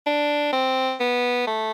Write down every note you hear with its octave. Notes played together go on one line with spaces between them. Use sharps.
D4
C4
B3
A3